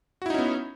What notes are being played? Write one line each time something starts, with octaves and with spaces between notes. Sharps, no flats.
B3 C#4 D#4 E4 F#4